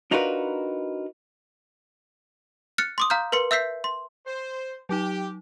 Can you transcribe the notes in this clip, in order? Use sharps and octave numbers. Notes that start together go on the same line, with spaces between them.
D4 D#4 F4 F#4 A#4 B4
F6 F#6 A6 C#7
C6 D6 D#6
F5 A#5 F6 G6
A#4 B4 C6 C#7
E5 E6 G6 B6 C7
C6
C5
F#3 D#4 G4